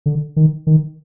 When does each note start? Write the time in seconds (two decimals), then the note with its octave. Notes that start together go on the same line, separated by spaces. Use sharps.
0.06 D3
0.36 D#3
0.67 D#3